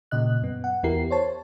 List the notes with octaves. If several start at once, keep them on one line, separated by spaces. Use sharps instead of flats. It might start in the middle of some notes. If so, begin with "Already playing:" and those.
A#2 C#3 D#5 F#6
F#2 B3
F#5
E2 B3 E4 G4 A#4 C7
C5 C#5 A5